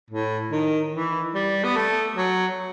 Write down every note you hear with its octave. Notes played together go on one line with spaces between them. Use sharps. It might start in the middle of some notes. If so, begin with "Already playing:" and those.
A2
D#3
E3
G3
B3
A3
F#3